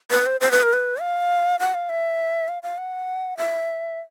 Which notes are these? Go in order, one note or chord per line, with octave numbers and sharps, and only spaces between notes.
B4
C5
C5
B4
A#4
B4
F5
F#5
F5
E5
F5
F5
F#5
E5